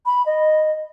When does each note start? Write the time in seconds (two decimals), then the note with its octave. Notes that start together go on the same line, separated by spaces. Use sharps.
0.06 B5
0.26 D#5